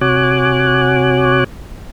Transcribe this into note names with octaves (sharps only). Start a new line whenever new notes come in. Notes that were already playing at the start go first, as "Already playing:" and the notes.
C3 F#4 C#5 G#5 D6 F#6